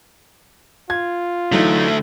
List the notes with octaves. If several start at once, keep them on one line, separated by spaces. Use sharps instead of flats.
F4 G#6
D3 E3 F#3 A3 D#4